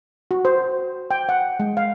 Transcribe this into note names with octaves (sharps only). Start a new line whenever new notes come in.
F#4
C5
G5
F#5
G#3
F5